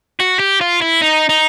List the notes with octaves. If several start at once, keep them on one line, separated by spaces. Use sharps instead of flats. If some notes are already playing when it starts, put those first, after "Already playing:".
F#4
G4
F4
E4
D#4
D#4